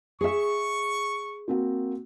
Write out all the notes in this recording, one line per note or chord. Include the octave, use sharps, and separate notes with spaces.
G#4 E5 C#6
A#3 C4 F#4